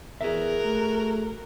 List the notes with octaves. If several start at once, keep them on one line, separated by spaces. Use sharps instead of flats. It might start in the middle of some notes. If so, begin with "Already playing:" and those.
E2 F#4 G#4 A#4 E5
A3